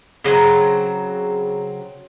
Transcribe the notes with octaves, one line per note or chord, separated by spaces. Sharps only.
C#3 F#3 C4 A#5